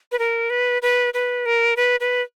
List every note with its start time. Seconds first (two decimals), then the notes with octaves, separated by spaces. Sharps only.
0.12 B4
0.19 A#4
0.50 B4
0.82 B4
1.14 B4
1.46 A#4
1.77 B4
2.00 B4